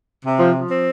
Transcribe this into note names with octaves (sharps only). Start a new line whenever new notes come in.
C3
F3
F3
C4